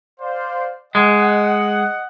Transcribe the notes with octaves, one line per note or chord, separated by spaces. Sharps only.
C5 D5 F5
G#3 D#5 F#5